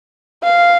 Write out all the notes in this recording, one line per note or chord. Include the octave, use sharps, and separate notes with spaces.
F5